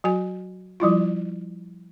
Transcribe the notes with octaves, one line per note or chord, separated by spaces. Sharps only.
F#3 F#4 G#5
F3 G3 E4 F4